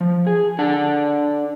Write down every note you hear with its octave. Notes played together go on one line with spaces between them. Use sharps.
F3
G#4
D4 A4 D5 F#5 A5